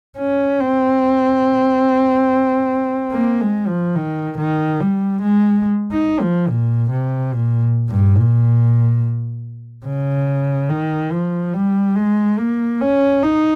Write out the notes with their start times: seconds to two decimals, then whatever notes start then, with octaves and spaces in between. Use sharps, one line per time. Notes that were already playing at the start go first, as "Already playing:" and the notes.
0.18 C#4
0.60 C4
3.12 A#3
3.41 G#3
3.68 F3
3.96 D#3
4.38 D#3
4.80 G3
5.22 G#3
5.93 D#4
6.21 F3
6.49 A#2
6.90 C3
7.34 A#2
7.89 G2
8.17 A#2
9.86 C#3
10.69 D#3
11.12 F3
11.54 G3
11.96 G#3
12.39 A#3
12.81 C#4
13.23 D#4